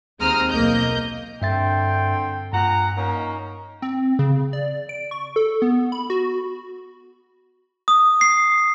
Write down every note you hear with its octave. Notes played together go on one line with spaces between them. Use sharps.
D#2 G#3 C4 A#5 D#6 F6
B1 A#3 D#5 G6
G2 D3 C4 E5 G5 A6
G2 A#2 F#5 A#5
A#3 C#4 D#4
C4
C#3
D5
D7
C#6
A4
B3
B5
F#4
D#6
C7